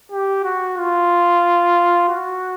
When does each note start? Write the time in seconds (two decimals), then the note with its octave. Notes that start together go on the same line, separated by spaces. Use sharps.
0.12 G4
0.44 F#4
0.78 F4
2.09 F#4